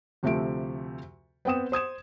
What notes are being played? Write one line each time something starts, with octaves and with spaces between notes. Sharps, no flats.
D2 C3 F3 A3 E5 D7
B3 C4 G5 D#6 E7
C5 D#6 G#6 E7